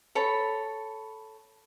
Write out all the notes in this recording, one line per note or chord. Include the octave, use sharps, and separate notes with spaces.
A4 C#5 B5